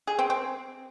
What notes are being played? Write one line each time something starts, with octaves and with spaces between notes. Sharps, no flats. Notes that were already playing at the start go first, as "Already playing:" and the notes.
G#4
C4
C4